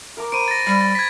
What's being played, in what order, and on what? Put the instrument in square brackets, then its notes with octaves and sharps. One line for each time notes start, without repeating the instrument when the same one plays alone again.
[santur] A#4 A#5 D6
[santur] C5 B5 C#6 [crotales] D7 D#7
[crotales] A6 A#6
[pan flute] G3 [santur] B5
[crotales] A6
G#6 B6